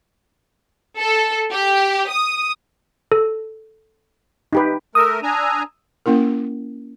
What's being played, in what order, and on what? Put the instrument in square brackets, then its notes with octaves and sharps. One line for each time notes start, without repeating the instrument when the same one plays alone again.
[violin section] A4
G4
D#6
[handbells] A4
[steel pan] D#4 G4 B4
[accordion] A3 A#4 [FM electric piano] D#6 E6
[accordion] D4 G#5 A#5
[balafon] A#3 C#4 E4 A#4